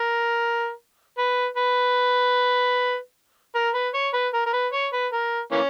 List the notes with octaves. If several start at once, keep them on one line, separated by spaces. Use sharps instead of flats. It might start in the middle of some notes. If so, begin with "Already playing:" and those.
Already playing: A#4
B4
B4
A#4
B4
C#5
B4
A#4
A#4
B4
C#5
B4
A#4
E3 A#3 C#4